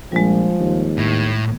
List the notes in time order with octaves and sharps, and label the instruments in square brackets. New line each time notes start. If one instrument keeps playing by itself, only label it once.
[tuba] A#1 [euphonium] F3 [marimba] G3 G#3
[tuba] D#2
[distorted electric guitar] A2